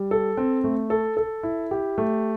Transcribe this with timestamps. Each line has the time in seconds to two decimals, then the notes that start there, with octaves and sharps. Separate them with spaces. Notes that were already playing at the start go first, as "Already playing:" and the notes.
Already playing: G3
0.11 A4
0.37 C4
0.64 A3
0.90 A4
1.17 A4
1.43 E4
1.71 G4
1.98 A3